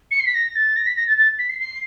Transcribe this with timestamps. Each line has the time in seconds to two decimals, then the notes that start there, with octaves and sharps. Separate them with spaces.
0.10 C#7
0.19 C7
0.26 B6
0.34 A#6
0.55 A6
0.75 A#6
0.86 B6
0.96 A#6
1.06 A6
1.17 A6
1.38 B6
1.49 C7
1.59 C7